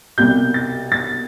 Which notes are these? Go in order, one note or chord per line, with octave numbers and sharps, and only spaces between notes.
C2 B2 G3 G6
A6
A6